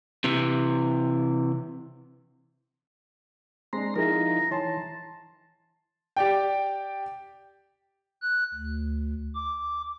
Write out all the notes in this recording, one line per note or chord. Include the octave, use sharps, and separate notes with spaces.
C3 E3
G#3 C4 D4 A#5 C6
F3 D#4 E4 G#4 A#4 A#5
E3 C#5 G#5 A5 C6
G4 D5 G5
F#6
D2
D6